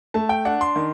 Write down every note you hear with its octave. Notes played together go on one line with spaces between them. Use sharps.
A3 A5
G5
D4 F#5
C6
D#3